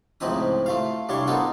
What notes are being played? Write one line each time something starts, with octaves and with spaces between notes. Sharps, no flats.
C#2 A2 F3 C4 D#4 D#6
A3 F4 F5
C2 G3 D4 C#5 C6 C#6
B3 D#4 F4 A4 A#4